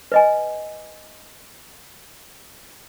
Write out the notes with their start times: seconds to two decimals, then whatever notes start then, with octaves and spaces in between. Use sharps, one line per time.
0.12 B4 D#5 G#5